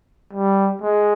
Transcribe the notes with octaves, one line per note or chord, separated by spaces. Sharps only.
G3
G#3